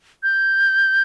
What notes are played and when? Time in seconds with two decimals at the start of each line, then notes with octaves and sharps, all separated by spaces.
0.23 G6